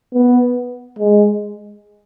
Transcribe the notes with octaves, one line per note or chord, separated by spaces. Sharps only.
B3
G#3